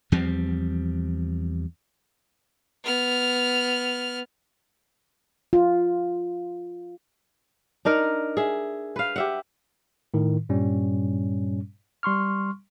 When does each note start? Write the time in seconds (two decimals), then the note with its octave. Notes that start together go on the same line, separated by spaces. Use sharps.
0.12 E2 F3 G3 C4
2.83 B3 F6
5.53 F4
7.85 D4 D#4 A#4
8.37 G#4 E5
8.96 B4 F5
9.16 G4 E5 F#5
10.14 A2 D#3
10.49 G2 A#2 G3 C#4
12.03 G3 C6 C#6 F6